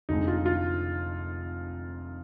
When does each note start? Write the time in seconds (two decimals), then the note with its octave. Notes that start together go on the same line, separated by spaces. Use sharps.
0.09 F1 F2 D3 G#3 D#4
0.28 F4
0.46 F4